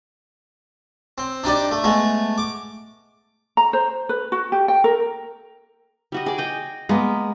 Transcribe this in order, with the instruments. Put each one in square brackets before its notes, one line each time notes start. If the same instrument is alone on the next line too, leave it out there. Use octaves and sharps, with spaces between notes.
[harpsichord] C4
D4 D#4 G4 D5
A3
G#3 A3 B3
D6
[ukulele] A#5
C5
B4
F#4
G4
G5
A#4
[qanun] G3 F#4 D#5
G#4 D5
D#5 G5 G#5
[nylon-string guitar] G#3 [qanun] A#3 B3